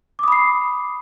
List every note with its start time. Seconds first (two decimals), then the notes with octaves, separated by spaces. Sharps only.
0.19 D6
0.23 D#6
0.28 B5
0.32 C7